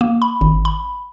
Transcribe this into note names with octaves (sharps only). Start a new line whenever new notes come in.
A#3
B5
G#1
B5